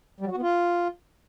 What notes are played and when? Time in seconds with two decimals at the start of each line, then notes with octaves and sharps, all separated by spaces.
0.21 G3
0.26 F#3
0.31 F#4
0.37 B3
0.42 F4